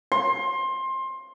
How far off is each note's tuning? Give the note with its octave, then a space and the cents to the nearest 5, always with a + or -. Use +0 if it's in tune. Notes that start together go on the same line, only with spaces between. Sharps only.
C6 +20